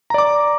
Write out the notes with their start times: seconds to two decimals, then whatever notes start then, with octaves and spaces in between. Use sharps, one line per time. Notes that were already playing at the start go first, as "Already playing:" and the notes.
0.10 A#5
0.14 D5
0.18 D6